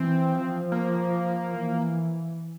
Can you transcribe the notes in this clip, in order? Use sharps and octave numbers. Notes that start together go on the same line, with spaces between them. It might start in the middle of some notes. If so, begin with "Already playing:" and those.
Already playing: E3 C4
F3
A#3
E3